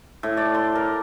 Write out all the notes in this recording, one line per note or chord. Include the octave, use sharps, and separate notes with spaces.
A2
D5
C6
A#4